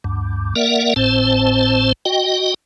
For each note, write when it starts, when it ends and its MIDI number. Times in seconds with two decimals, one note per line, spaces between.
0.04 0.54 38
0.04 0.54 43
0.56 0.94 58
0.56 0.94 70
0.56 0.94 74
0.56 0.94 76
0.56 0.94 78
0.96 1.92 32
0.96 1.92 45
0.96 1.92 60
0.96 1.92 72
0.96 1.92 81
2.05 2.54 66
2.05 2.54 75
2.05 2.54 79